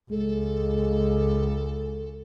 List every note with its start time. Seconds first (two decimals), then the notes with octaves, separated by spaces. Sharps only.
0.11 C#2 G#3 A4